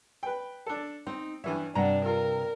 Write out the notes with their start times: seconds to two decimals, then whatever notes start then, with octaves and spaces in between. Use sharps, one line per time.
0.23 B4 G5
0.66 D4 A4
1.07 C4 D#4
1.44 G2 E3 C#5 E5 G#5
1.75 G2 C3 D4 F#5 A#5
2.06 F4 A#4